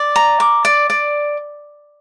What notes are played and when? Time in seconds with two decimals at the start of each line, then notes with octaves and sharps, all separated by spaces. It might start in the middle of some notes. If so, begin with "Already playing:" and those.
Already playing: D5
0.16 A#5
0.40 D6
0.65 D5
0.90 D5